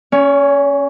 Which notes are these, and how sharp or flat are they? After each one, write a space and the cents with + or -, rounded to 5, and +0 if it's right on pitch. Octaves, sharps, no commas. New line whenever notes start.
C#4 +0 C#5 +40